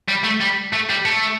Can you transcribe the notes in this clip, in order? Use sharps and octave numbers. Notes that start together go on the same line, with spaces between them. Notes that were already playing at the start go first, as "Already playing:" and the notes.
G3
A3
G3
A3
G3
A3